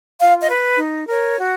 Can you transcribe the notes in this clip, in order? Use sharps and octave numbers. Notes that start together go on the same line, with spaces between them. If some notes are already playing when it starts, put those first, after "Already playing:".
F4 F5
D#5
B4
D#4
A#4 C#5
F#4